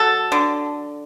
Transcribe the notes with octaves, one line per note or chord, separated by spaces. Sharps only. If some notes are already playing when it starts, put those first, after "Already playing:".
Already playing: F#3 A4
D3